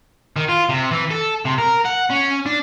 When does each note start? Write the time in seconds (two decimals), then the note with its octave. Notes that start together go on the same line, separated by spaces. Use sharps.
0.36 D#3
0.49 F4
0.69 C3
0.91 E3
1.11 A4
1.45 C3
1.58 A#4
1.85 F#5
2.10 C#4
2.46 D4